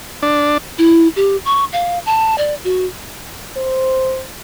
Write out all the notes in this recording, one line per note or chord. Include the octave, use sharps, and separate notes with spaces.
D4
E4
G4
C#6
F5
A5
D5
F#4
C5